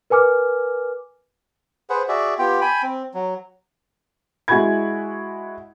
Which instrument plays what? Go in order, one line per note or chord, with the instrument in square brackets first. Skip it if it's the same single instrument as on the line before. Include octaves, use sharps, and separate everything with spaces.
[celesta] A#4 B4 G#5 D6 F6
[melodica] G#4 B4 C5 F#5
F#4 G#4 D5 E5
B3 F4 G4 G5
G5 G#5 B5
C4
F#3
[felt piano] G#3 E4 F#4 G#5 B5 G#6